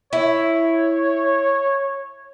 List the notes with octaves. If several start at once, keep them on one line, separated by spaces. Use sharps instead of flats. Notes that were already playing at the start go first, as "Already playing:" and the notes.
E4 C#5